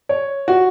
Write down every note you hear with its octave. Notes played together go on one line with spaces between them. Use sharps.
C#5
F#4